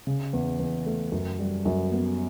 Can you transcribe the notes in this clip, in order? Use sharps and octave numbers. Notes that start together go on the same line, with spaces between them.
C#3
E2
E2
A3
F#2
G3
F#2
B3